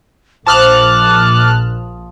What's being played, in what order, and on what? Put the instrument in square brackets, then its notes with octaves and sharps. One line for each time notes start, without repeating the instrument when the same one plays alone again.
[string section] A#1 [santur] F3 D#6 [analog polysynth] A5 F6 F#6 [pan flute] D6